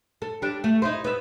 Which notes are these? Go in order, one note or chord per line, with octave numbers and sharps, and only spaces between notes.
A4
G3 D4
A3
D#4 E4 C5
B3 E5